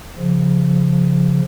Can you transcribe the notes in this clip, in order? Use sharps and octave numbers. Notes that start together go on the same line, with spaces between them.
C#3 F3